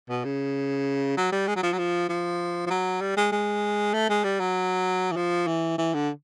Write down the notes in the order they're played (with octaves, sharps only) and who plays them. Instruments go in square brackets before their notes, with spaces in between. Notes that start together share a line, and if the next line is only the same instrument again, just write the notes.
[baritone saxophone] B2
C#3
F#3
G3
G#3
F#3
F3
F#3
F3
F3
F3
F#3
G3
G#3
G#3
A3
G#3
G3
F#3
E3
F3
E3
E3
D3